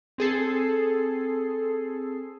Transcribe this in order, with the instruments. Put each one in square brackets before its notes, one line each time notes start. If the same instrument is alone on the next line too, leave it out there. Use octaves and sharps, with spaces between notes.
[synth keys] C4 G#4 A4 C7